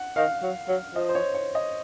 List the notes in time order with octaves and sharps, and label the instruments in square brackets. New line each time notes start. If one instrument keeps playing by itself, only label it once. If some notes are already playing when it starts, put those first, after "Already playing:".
Already playing: [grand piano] F#5
[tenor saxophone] D#3 [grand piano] F5
[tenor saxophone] F#3
F#3
[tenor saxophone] F3 [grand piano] D#5
[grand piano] C5
C#5
C#5
D#5